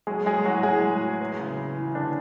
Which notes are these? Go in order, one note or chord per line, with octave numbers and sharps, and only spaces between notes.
F#3 G#3 G#4
F#3 G#3 G#4
A2 F#3 F#4
A2 G#3 G#4
F#3
F#3
E2
C#3
E2
E3
E2 D3 D4